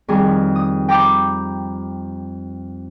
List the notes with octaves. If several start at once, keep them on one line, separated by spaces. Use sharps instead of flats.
F2 D#3 G3 G#4
D#6
G5 A#5 B5 D6